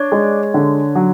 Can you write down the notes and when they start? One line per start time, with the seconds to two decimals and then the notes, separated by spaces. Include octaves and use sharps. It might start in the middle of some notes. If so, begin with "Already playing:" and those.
Already playing: D4 C#5
0.12 G#3
0.54 D3
0.95 F#3